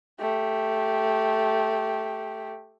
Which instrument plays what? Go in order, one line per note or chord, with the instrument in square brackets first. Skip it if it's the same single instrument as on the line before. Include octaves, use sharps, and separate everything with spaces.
[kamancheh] A3 G4